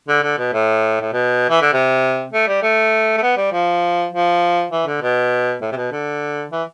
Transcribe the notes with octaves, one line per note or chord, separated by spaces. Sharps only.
D3
D3
B2
A2
A2
B2
E3
D3
C3
A3
G3
A3
A3
B3
G3
F3
F3
E3
D3
B2
A2
C3
B2
D3
E3